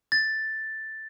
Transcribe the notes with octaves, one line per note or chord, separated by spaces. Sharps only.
A6